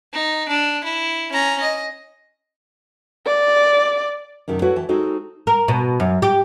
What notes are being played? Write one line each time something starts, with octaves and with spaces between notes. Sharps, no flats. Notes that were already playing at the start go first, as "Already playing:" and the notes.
D#4
D4
E4
C#4 A#5
D#5
D5
F#2 C3 D#3 A5
E4 F#4 A4 B4 C#5 F#5
E3 G5 A5
G#3 C4 D#4 F#4 A4
A#4
B2
F#2
G4